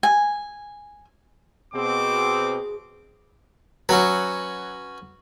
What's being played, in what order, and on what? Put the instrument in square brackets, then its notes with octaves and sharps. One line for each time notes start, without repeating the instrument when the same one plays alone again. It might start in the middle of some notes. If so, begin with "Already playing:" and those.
[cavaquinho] G#5
[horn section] B2 C4 [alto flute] G#4 [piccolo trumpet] D6
[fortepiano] F#3 [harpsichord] C#4 F#4 B4